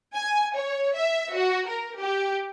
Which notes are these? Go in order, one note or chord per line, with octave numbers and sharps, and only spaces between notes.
G#5
C#5
E5
F#4
A#4
G4